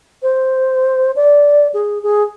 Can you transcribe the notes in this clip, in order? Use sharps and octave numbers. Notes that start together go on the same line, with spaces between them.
C5
D5
G#4
G#4